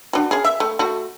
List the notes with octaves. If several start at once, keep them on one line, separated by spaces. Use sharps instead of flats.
D4 F#4
C#4 G#4
E5
A3
A3 F#4